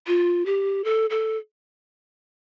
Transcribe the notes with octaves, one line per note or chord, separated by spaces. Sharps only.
F4
G4
A4
A4